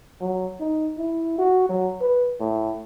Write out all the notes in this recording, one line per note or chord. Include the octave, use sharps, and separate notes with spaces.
F#3
D#4
E4
F#4
F#3
B4
A2